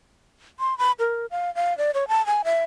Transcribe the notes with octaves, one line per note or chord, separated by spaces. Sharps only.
C6
B5
A#4
F5
F5
D5
C#5
A5
G#5
E5